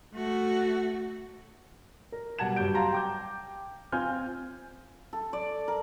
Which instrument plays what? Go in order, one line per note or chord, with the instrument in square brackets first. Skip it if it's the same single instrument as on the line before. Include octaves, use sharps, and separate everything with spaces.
[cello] A3 F#4
[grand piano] A#4
B2 G3 F#5 A5 G#6 E7
G2 F#3 G3 F#4 G6 D7
F5 A5 A#5 C6
G5 D6 G6
C4 F4 G#5 F6 G6
[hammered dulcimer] A4
D5
A#4